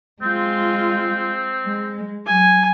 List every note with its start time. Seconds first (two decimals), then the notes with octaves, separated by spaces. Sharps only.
0.22 G#3 C4 F4
1.65 G#3
2.26 F#3 G#5